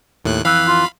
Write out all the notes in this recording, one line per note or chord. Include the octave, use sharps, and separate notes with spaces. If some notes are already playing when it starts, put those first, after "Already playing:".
D#2 A2 F#6
F2 E3 F5 B5
F4